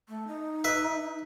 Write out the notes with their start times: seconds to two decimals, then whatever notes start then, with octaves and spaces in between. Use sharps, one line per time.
0.09 A3
0.27 D#4
0.64 B4 E5